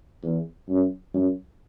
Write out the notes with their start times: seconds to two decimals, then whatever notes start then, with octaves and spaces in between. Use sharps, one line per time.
0.23 E2
0.69 F#2
1.14 F#2